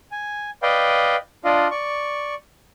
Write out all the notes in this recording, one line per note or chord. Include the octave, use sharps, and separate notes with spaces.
G#5
B4 D5 D#5 F5 G5
D4 F4 D5 D#5 F5
D5 C#6